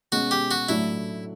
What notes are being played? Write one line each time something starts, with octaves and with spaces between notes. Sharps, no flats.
B2 G#3 C#4 F#4
G4
F#4
A2 F#3 A3 D4 E4